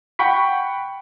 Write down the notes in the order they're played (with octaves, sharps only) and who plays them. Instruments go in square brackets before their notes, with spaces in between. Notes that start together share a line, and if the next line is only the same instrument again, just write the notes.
[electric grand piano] F#5 G5 B5 C#6 B6